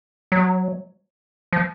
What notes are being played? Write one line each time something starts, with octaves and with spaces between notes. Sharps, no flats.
F#3
F3